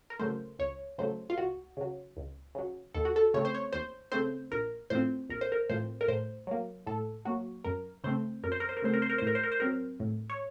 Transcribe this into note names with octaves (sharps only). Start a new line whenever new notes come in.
A#4
C#3 F#3 A3 C5
C#2 C#5
C#3 F#3 A3 C5
F4
C#2 F#4
C#3 F#3
C#2
C#3 F#3
D#2 A4
F#4
A4
C#3 A3 C4 C#5
C5
C#5
D#2 C5
C#3 A3 C4 C5
A#1 A#4
A2 F3 C4 C5
A#1 A#4
C5
A#4
A2 F3 C4 C5
A#4
A2 C5
F#3 A#3
A2 A4
F#3 A#3 F#4
F#2 A#4
C#3 A3 C4 C5
F#2 A#4
C5
A#4
C5
A#4
C#3 A3 C4 C5
A#4
C5
A#4
A2 C5
A#4
C5
A#4
C5
F#3 C4 A#4
A2
C#5